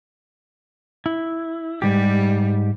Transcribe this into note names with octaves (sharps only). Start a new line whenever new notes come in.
E4
G#2 E3 G3 G4